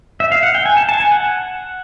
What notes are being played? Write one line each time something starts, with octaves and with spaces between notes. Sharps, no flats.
E5
F5
F#5
G5
G#5
A5
A5
G#5
F#5